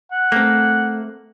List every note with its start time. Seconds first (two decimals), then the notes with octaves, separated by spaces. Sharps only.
0.12 F#5
0.32 A3 A#3 C4